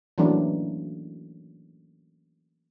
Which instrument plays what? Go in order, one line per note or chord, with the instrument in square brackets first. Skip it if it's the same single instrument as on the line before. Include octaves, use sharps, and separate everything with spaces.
[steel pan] E3 F#3 A3 A#3 C#4 D4